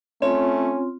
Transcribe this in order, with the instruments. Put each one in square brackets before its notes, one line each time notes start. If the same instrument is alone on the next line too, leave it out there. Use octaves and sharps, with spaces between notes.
[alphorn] A3 [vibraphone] C4 F4 [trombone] C#4 [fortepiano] C#5